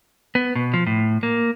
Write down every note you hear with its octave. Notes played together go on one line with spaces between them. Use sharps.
B3
B2
F3
A2
A#3